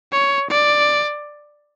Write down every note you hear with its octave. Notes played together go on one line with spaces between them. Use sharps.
C#5
D5